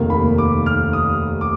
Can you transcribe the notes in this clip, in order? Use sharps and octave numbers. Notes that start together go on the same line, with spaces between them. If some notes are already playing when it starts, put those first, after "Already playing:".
Already playing: F1 D#2 D#3 A#3
B5
D6
F6
D#6
D6